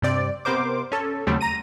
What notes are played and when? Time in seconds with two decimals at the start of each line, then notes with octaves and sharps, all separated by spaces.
0.02 G2 C3 C4 D5
0.45 C3 B3 A#4 C5 D6
0.92 C#4 A4
1.27 D#2 C#3 F#3 G3 A3 C4
1.41 A#5 A#6 D#7